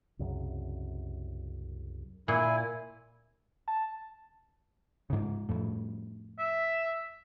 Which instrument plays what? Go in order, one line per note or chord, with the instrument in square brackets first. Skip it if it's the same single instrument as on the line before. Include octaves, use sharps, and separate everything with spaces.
[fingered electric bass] C2 F#2 C#3
[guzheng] A#2 [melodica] E4 G#5
[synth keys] A5
[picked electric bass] G#2 C#3
F2 A2
[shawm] E5